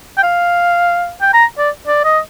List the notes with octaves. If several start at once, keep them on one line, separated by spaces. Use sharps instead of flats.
G5
F5
G5
A#5
D5
D5
D#5